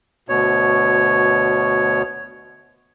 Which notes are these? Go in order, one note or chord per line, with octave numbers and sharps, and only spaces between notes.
D2 B2 C#5